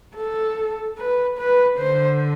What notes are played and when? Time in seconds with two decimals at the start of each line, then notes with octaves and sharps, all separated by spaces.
0.16 A4
0.98 B4
1.38 B4
1.78 D3 C5